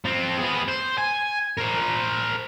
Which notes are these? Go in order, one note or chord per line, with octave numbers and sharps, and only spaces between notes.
F3 C4
B3 G#4
C5
G#5
A#4 C5